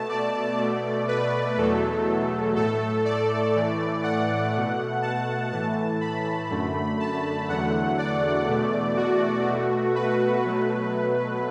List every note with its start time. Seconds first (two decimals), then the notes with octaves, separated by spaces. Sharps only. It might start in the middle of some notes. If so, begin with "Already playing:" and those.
Already playing: B2 A3 A5
0.09 D5
0.59 B2 A3
1.08 B4
1.57 E2 B2 F#3 A3 A4
2.56 A2 A3 A4
3.05 D5
3.54 A2 E3 A3
4.03 F#5
4.53 B2 A3
5.02 A5
5.51 A2 E3 A3 A5
6.01 B5
6.50 F#2 D3 A3
7.00 A5
7.48 E2 D3 F#3 A3 F#5
7.98 D5
8.48 E2 B2 A3
8.97 F#4
9.46 B2 A3
9.95 B4
10.44 B2 F#3 A3